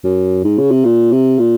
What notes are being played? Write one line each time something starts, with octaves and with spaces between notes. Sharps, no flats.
F#2
G#2
C#3
C3
A#2
C3
A#2